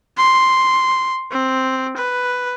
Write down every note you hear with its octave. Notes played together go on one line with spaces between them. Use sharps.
C6
C4
B4